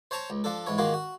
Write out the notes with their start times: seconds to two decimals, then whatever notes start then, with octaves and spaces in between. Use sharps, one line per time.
0.11 C5 C#5 A5 A#5 C#6
0.30 C#2
0.44 F3 D4 A4
0.67 G#2 E3 C#5
0.78 D#3 A#3 F4 F#4 G#4
0.94 F#4